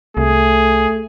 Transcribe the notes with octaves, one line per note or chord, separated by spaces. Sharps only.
C2 A3 G#4